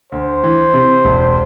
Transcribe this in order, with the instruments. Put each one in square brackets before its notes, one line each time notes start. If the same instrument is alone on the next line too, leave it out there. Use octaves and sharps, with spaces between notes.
[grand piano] D2 [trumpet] C5
[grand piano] E3
C3
E1